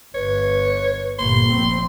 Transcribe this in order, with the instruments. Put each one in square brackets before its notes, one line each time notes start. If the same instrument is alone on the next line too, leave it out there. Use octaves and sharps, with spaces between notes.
[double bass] G1 [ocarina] B4 [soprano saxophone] C#5
[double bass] G1 A#2 [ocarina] A#3 [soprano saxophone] C6
[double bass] F1 C4